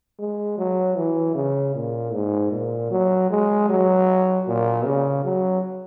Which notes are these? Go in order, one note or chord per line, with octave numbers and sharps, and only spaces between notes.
G#3
F#3
E3
C#3
A#2
G#2
A#2
F#3
G#3
F#3
A#2
C#3
F#3